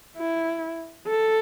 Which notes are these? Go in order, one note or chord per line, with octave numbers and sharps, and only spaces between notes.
E4
A4